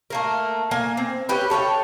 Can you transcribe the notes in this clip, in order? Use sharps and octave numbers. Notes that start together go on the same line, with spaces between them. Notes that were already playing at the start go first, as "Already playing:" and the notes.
A3 A#3 A#4
A#3 G#5
C4
C#4 G4 B4
A4 C#5 F5 G5